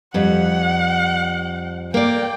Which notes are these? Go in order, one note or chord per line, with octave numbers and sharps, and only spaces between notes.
F2 G3 F#5
A#3 D5 G5